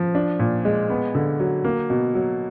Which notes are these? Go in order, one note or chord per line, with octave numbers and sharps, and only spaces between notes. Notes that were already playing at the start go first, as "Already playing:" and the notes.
Already playing: F3
D4
A#2
G#3
B3
D3
F#3
A#3
B2
F#3